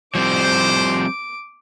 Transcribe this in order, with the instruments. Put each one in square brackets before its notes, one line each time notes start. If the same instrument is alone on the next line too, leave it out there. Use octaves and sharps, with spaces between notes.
[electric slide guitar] F3 G3 C4 [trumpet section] C5 [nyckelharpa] D6